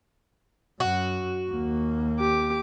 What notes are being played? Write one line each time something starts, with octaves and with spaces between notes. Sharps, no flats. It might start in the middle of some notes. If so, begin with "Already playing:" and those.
F#2 F#4
D#2 A#3
G4 D6